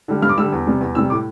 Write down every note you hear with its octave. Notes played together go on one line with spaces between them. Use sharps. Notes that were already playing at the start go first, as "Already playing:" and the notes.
D3 G3
G2 F6
D6
D3 G3 E6
E2
C3 G3
E2
C3 G3 E6
A2 D6